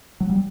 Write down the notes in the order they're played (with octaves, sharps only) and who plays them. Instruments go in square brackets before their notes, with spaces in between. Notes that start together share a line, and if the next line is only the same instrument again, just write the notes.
[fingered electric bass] F#3
G3